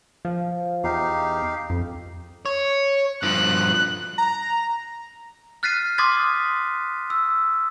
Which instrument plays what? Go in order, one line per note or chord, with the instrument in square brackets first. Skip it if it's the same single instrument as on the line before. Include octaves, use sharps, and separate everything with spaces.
[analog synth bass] F3
[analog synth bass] E2 [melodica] D#4 G4 F5
[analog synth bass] F2
[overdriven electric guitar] C#5
[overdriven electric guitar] G2 F3 [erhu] F#6
[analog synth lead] A#5
[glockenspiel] F6 F#6 A6 B6 C7 D#7
C6 D6 D#6 G#6 A6 B6
E6